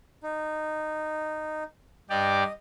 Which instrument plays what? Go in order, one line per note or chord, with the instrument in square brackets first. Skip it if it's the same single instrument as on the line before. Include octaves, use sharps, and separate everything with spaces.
[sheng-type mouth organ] D#4
[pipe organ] G2 G4 D5 [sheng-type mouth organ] D#5